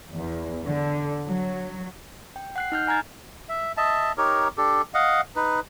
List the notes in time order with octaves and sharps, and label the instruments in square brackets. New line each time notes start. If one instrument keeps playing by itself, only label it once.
[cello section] E2
D3
F#3
[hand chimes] G5
F#5 F#6 C7
D#4 F6 G6
G#5 A#5 F6 G#6 A6
[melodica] E5
D#5 E5 A5
D#4 G4 A#4 C#5
D4 G4 A4
D#5 F5 F#5
D#4 B4